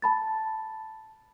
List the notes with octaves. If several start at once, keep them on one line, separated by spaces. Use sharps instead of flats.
A5 B5 A6